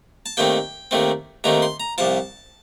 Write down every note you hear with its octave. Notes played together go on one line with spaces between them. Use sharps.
A5
D#2 D#3 A3 C4 G5
D#2 D#3 A3 C4
D#2 D#3 A3 C4 A#5
C6
A#5
C2 C3 F3 A5